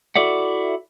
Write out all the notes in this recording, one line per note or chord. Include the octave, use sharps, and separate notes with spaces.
E4 F#4 A4 D5 E5 F#5